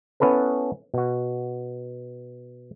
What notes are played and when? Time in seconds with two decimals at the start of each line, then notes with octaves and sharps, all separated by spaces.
0.20 B3 C#4 E4 A4 B4
0.94 B2 F#4